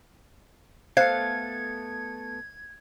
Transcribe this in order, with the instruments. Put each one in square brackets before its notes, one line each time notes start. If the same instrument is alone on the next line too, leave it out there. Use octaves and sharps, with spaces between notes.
[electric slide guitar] A3 B3 A4 [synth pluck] C5 F#6 [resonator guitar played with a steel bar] F5 [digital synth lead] G#6